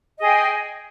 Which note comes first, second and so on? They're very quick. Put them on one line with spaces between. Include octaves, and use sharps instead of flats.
D#5 G#4 G5